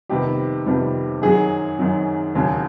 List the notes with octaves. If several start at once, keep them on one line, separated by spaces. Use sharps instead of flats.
F2 C3 D#3 G3 B3 G4
F2 C3 D#3 G3 B3
F#2 D#3 F#3 G#4
F#2 D#3 F#3
E1 D#2 C#3 F#3